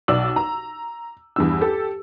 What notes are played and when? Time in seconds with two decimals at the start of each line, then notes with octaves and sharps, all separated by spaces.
0.08 B1 D5 E6 F#7
0.36 A#5
1.36 E2 G2 E6
1.61 G4 A4